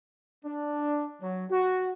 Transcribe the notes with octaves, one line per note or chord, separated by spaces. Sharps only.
D4
F#3
F#4